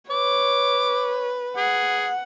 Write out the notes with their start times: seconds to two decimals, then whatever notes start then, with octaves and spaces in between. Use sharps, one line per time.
0.11 B4 C#5 D6
1.57 G#4 F#5